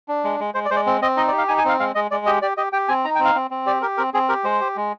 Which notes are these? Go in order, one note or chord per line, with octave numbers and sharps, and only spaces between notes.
D4
G#3
G#3
G#3 C5
D5
G#3 C5
D5
C4
C4 D#5
D#4 D#5
D5
G4
F5
D#4 G#5
G#5
C4 F5
G#3 F5
G#3 D#5
G#3 D5
G4 D#5
G4 D5
G4 D#5
G4 G5
C4 G#5
D#4 A#5
G5
C4
F5
C4
C4
G4 D5
G4 A#4
C4 A#4
C4 G#4
G4 A#4
G#3 C5
G4
G#3